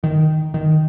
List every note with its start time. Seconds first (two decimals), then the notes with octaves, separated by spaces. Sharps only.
0.04 D#3
0.54 D#3